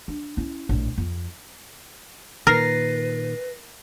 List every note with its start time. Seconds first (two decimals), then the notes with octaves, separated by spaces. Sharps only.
0.08 D4
0.37 C#4 E4
0.69 A#1 A2
0.98 F2
2.47 A#2 D#3 A#4 B4 A6 A#6 C7